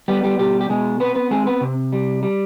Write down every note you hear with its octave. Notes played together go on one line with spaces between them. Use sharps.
G3 B3 G4
G3 G4
B2 G3 G4
G4
B2 G#3 G#4
B3 C4 B4
B3 B4
G#3 C4 G#4
B3 B4
C3
G3
G3